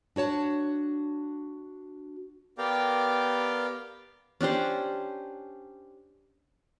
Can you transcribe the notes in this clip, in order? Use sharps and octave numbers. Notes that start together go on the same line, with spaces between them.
D4 F#4 C#5 A5
B3 G4 A#4 D5 F5 G5
C#4 D4 G4 C5